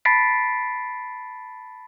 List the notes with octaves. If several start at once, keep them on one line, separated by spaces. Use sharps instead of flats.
A5 B5 A6 B6 C7 D7